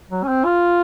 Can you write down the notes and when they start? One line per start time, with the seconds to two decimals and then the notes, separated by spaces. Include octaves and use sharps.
0.11 F#3
0.23 C#4
0.28 C4
0.45 F4